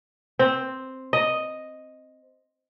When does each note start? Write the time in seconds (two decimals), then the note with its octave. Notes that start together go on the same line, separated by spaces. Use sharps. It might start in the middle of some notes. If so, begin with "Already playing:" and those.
0.39 C4
1.13 D#5